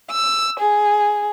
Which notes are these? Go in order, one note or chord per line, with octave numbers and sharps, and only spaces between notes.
E6
G#4